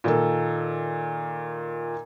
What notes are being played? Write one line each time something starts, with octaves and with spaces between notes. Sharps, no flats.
A#2 D#3 A4